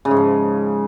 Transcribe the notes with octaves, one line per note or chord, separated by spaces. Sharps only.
C#3
G#2
F3